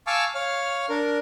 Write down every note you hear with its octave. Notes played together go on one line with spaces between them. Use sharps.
F5 G#5 A5 C#6 D6 E6
C#5 F5 F6
D4 A#4